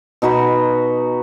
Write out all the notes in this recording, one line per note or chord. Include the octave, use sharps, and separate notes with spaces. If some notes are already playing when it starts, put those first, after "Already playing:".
B2 D#4 F#4 B4